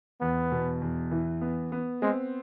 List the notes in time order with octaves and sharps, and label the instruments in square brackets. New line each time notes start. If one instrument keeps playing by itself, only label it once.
[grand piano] E2 [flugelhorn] B3
[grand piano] B2
E2
E3
B3
B3
[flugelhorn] G#3 [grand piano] C4